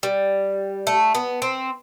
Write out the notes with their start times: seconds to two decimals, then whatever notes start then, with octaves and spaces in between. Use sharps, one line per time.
0.03 G3
0.87 A3
1.15 B3
1.42 C4